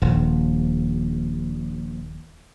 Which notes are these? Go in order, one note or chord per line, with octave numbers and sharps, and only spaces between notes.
D#1 A#1